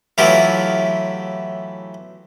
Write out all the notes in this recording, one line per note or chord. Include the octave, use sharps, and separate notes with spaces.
A2 E3 F#3 E4 F4 G4